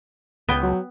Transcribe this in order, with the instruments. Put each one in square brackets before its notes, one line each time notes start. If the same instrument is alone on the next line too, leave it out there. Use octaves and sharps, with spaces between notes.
[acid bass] C#2 [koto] B3 G5
[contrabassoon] F#3